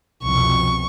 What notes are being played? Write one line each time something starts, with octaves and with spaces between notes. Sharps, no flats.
C2 F2 B2 C#6